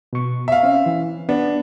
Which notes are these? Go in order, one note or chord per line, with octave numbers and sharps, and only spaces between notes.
B2 C#6
E5 F5
C4 C#4
E3
B3 D4